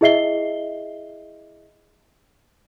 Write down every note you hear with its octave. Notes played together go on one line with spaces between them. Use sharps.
E4 G#4 D#5 E5 C7 G7